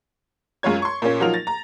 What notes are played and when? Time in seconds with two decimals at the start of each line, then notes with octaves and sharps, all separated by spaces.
0.63 F#2 G#3 F4 C#5 G#6
0.82 C6 C#6
1.02 A#2 A#3 C#4
1.20 F3 F#3 D#4 F4 A#4 F7
1.34 A6 A#6
1.47 A#5